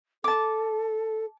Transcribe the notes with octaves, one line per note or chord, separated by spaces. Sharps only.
A4 A5 D6